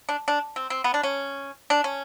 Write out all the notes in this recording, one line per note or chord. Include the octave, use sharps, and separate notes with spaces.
D4
D4
C4
C4
B3
D4
C#4
D4
C#4